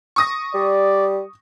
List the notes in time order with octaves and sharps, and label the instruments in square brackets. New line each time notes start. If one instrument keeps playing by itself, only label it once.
[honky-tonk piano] C#6 D#6 A#6
[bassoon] G3 [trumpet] D5